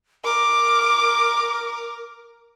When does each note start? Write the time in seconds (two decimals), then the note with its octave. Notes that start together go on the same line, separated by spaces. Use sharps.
0.24 A#4 D6